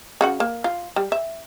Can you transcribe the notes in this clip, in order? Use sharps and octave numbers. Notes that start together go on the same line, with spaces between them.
C#3 F#4 F#5
A#3
F4
G3
E5